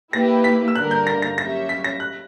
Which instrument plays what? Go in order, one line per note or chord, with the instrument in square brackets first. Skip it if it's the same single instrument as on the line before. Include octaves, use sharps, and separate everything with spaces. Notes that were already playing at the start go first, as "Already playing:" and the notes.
[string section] A#3 E4 G4 B4 [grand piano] A#6
[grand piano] B6
E6
[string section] G2 D3 A#3 D4 A#4 [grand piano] F#6
[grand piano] G6
A#6
A#6
[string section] F#3 C#4 G4 C#5 E5 [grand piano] A#6
[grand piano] B6
A#6
F#6